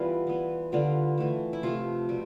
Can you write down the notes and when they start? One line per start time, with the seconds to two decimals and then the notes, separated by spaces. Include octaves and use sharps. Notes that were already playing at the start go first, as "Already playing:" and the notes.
Already playing: E3 G3 B3 F4
0.27 E3 B3
0.72 D3 G3 B3 F4
1.18 E3 A3
1.53 E4
1.63 C3 F3 A3 F4
2.09 B2 G3